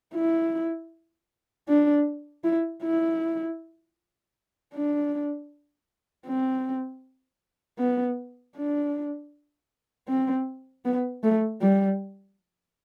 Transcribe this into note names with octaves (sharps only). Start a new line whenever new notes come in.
E4
D4
E4
E4
D4
C4
B3
D4
C4
B3
A3
G3